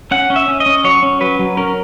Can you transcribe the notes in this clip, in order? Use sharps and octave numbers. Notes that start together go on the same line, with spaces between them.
C#4 F#5
C#4
E5
C#4
D#5
C#4
F#3 C#5
C#4
F#3 B4
F#3
C#4 A#4